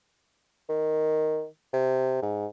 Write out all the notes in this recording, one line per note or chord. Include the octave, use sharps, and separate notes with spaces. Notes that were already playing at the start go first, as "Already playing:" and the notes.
D#3
C3
G#2